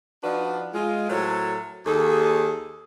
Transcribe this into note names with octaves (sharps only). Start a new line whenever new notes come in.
F3 D4 D#4 F#4 B4 D5
G#3 F4
A2 F#3 A4 A#4 C5 C#5
D#2 G#4 A4